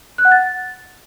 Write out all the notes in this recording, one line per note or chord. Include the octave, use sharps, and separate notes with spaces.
F#6
F#5
A6